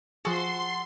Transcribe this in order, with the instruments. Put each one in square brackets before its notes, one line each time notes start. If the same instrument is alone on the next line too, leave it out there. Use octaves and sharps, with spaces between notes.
[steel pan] F3 G#4 [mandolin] F#4 A4 [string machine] C6